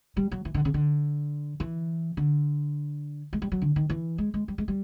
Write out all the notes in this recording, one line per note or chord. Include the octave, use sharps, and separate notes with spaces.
G3
F#3
E3
D3
C#3
D3
E3
D3
G#3
G3
F#3
D3
D#3
E3
G#3
G#3
G3
G#3
G3